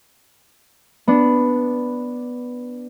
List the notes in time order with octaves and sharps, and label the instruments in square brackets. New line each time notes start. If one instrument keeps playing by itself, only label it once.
[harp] B3 D4